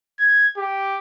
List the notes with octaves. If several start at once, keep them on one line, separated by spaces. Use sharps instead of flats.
G#6
G4